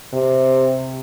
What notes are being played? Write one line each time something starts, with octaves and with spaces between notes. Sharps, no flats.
C3